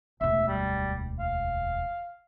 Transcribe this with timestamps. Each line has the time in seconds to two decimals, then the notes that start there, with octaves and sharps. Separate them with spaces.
0.21 E1 D2 E5
0.48 G3
1.20 F5